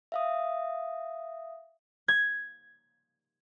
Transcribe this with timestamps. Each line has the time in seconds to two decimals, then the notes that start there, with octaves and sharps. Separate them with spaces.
0.12 E5 F5 D#6
2.08 G#6